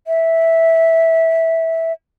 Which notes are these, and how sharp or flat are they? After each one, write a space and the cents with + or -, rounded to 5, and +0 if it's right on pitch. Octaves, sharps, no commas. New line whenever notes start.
E5 -10